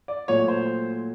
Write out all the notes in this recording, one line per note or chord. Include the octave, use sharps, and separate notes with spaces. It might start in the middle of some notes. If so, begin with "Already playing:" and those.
D5
A#2 F#3 A3 C#5
C5